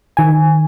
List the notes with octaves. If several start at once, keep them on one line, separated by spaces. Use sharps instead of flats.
D#3 G#5